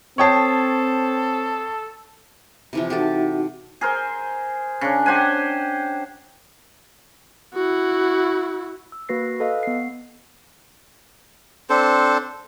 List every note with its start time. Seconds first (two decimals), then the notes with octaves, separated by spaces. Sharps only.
0.18 C4 A4 C#5 G5 A5 C#6 D#6 C7
2.73 C3 E3 F3
2.90 D#4 F#4 G4 A4 F#5 A5
3.81 G#4 A#4 C5
4.81 C#3 D4
5.06 G4 C5 F#5 G#5
7.54 E4 F#4
8.92 E6
9.09 A#3 F#4 B4 A#6 C7
9.40 A4 B4 D#5 F5
9.63 B3 C7
11.70 C4 D4 A4 C5